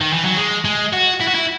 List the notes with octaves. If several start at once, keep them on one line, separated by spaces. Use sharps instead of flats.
D#3
E3
F#3
G#3
G#3
F#4
E4
F#4
E4